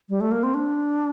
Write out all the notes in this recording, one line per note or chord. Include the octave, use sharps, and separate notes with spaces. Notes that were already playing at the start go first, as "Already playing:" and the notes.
G3
A3
A#3
C4
D4